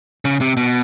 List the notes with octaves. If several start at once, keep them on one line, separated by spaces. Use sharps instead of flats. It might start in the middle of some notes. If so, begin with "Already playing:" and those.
C#3
C3
B2